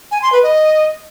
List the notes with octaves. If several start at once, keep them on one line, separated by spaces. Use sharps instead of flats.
G#5
C6
B4
D#5